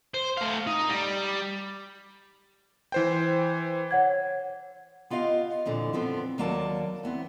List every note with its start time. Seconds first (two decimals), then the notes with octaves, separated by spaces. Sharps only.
0.14 C5
0.37 A3 F5
0.67 D#4
0.89 G3
2.92 E3 C5 G5
3.91 C#5 F#5 G#6
5.10 B3 F4 G4 D#5 F5
5.66 F2 A#2 D3 E3
5.93 F3 B3 C4 A4
6.38 D#2 F#3 A#3 D5 A5
7.03 E3 B3 C4